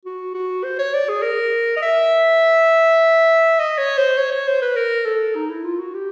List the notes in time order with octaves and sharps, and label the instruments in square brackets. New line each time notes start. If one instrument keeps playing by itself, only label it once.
[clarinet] F#4
F#4
C5
C#5
D5
G#4
A#4
D#5
E5
D#5
C#5
C5
C#5
C#5
C5
B4
A#4
A4
D#4
E4
F4
F#4
G4